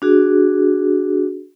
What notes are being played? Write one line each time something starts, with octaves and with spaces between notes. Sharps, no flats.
D4 F#4 G#4